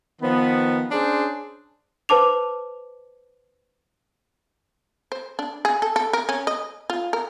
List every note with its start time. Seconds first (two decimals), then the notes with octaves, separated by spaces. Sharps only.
0.22 D#3 F3 B3
0.91 C#4 D4 G#4 C5
2.09 B4 C5 A5 D6 F7
5.12 C5
5.39 D4
5.65 G#4
5.82 A4
5.96 A4
6.13 A#4
6.29 C#4
6.47 D#5
6.90 F4
7.13 A#4